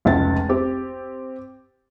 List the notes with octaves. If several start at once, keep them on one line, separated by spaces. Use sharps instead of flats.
F1 C#2 C#4 A6
C4 G4